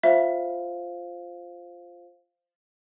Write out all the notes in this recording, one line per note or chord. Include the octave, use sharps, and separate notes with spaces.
F4 C5 E5 F5